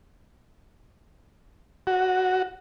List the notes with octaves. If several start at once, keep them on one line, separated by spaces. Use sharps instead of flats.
F#4